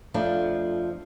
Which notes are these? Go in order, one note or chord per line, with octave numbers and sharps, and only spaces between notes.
F2 F3 A3 D4